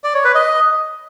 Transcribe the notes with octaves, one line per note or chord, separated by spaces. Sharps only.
D5
C#5
B4
D#5